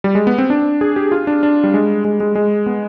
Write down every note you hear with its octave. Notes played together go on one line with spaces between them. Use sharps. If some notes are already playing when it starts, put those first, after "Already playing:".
G3
G#3
B3
C4
D4
G#4
G4
F4
D4
D4
G3
G#3
G#3
G#3
G#3
B3